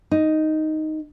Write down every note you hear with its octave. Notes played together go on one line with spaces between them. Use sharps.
D#4